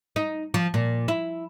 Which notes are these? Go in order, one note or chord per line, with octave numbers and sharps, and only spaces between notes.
D#4
F3
A#2
E4